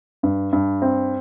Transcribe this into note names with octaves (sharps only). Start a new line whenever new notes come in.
G2
G2
C4